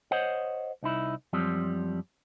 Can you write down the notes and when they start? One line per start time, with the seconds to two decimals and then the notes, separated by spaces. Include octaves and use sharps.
0.11 C5 C#5 D#5 F#5
0.83 C2 D#4 E4
1.33 F#2 F3 G3 C4